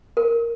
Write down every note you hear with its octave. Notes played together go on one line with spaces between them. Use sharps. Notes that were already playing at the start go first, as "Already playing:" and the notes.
A#4